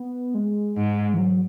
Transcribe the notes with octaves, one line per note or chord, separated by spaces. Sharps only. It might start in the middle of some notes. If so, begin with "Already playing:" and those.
Already playing: B3
G#3
G#2
E3
F#3